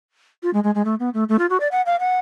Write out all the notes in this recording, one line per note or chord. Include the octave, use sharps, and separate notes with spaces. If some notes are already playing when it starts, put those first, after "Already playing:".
F4
G#3
G#3
G#3
A3
B3
A3
A3
F4
F#4
D5
F#5
F5
F#5